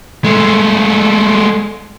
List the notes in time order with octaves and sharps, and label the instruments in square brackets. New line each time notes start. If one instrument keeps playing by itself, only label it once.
[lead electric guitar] G#3 A3